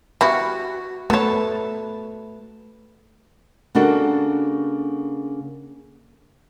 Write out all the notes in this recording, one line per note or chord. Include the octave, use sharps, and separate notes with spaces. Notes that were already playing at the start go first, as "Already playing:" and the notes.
G3 B3 E4 F#4
A3 B3 A4 B4 C#5 A5
C#3 A#3 D4 F#4 A4